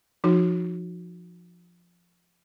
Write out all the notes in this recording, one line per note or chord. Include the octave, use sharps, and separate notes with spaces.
F3 D#4 F#4